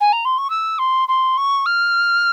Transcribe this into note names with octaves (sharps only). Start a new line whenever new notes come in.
G#5
A#5
C6
C#6
E6
C6
C6
C#6
F6